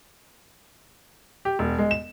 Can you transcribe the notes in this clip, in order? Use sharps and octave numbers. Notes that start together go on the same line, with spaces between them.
G4
E1
G#3
E7